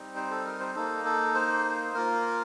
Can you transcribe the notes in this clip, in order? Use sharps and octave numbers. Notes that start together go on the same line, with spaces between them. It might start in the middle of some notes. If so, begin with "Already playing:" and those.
Already playing: G3 C4 D#4
C5
A4
A#4
C5
A#3 D#4 A4
A4
C5
A#3 F4 A#4